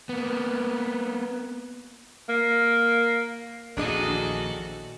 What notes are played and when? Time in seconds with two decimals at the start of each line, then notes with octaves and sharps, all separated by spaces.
0.09 A#3 B3
2.29 A#3
3.77 A#1 E2 D#3 D4 F#4 G#4 A4 D#5